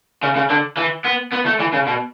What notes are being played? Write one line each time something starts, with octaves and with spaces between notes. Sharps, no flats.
C#3
C#3
D3
E3
B3
B3
A3
E3
C#3
B2